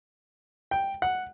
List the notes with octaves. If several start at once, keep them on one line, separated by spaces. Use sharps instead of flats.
G5
F#5